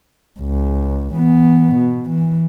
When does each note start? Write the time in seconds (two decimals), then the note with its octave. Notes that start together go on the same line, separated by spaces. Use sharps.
0.40 C#2
1.15 E3 B3
1.75 B2
2.10 E3